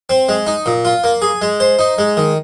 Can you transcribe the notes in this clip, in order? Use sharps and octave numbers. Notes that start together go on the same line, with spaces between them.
C4
G#3
D#4
A#2
F4
A#3
G#4
G#3
C5
D#4
G#3
D#3